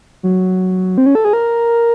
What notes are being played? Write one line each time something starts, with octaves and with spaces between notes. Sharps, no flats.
F#3
C4
C#4
A4
G#4
A#4